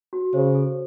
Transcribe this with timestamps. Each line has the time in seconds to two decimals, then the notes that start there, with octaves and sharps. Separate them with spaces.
0.13 F#4
0.34 C#3 C5
0.55 A4